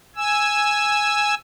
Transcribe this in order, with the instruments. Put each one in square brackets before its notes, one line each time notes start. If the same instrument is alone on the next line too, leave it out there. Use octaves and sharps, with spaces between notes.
[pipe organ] G#5 E6